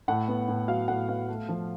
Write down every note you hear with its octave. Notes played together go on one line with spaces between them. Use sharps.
A2 F#5
B3
A2
F#3 F5
A2 F#5
B3 F5
A3
F3